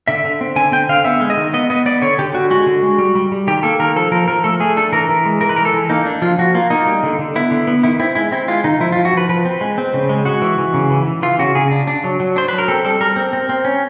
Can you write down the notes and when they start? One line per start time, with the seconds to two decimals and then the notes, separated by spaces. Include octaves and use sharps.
0.08 D3 E5
0.25 D3
0.41 C4
0.56 D3 G#5
0.72 C4 G5
0.89 D3 F5
1.04 B3 E5
1.21 G#3
1.30 D#5
1.37 D#3
1.54 B3 D#5
1.70 B3 D#5
1.86 B3 D5
2.02 D3 C#5
2.19 D3 G4
2.34 D3 F#4
2.51 G#3 F#4
2.66 D3
2.83 G#3
2.98 G3
3.15 G3
3.32 G3
3.47 D#3 G4
3.63 A#3 A4
3.79 D#3 A#4
3.96 F3 A4
4.11 F3 A#4
4.28 F3 A#4
4.44 A3 A4
4.60 A3 G#4
4.77 D4 A4
4.93 E3 A#4
5.09 E3
5.25 G#3
5.41 E3 A#4
5.49 B4
5.56 E3 A#4
5.65 A4
5.74 E3
5.90 A#3 D#4
6.06 D4
6.22 F3 F4
6.38 F3 F#4
6.55 A#3 F4
6.70 A#3 D#4
6.87 G3
7.03 D3
7.19 D3
7.36 B3 E4
7.51 D3
7.67 B3
7.83 D#3 E4
8.00 C4 E4
8.15 G#3 E4
8.32 C4 E4
8.48 G#3 F4
8.64 D#3 D#4
8.80 F3 E4
8.92 F4
8.97 F3
9.05 F#4
9.13 F3 B4
9.29 F3 B4
9.45 C4
9.61 G#3
9.78 C4
9.94 C#3
10.09 G#3
10.25 G#3 F#4
10.42 E3
10.58 E3
10.74 C#3
10.91 E3
11.06 E3
11.23 E3 F4
11.39 C#3 F#4
11.55 C#3 G#4
11.71 D4
11.87 D4
12.04 F#3
12.20 F#3
12.36 D4 C5
12.48 F#3 B4
12.58 A#4
12.68 C4 A4
12.85 G3 A4
13.01 G3 A#4
13.16 C4
13.33 C4
13.49 C4
13.65 C#4